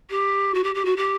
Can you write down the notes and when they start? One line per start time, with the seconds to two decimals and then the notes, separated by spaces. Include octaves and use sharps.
0.10 G4
0.54 F#4
0.64 G4
0.75 G4
0.85 F#4
0.97 G4